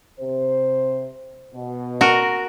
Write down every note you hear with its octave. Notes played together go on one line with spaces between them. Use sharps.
C3 C5
B2
F#4 A#4